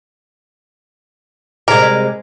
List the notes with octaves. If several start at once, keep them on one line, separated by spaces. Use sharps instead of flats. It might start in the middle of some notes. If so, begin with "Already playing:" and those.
C3 G3 G#3 A#4